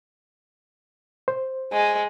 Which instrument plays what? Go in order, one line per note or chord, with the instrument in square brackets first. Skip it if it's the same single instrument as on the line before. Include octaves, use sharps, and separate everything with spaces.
[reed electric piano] C5
[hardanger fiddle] G#3